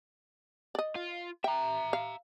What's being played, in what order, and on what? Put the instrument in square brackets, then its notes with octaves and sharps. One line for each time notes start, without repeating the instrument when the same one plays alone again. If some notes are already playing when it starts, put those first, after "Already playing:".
[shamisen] D5 D#5
[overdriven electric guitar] F4
[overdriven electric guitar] E5 A#5 [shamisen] G5
[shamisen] F5